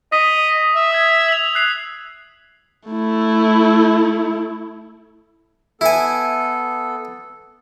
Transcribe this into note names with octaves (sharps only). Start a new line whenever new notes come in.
D#5 D#6 B6
E5
D#6 E6 G#6
F7 F#7
F#6 C7 F7
A3 E4
B3 E4 A4 G#5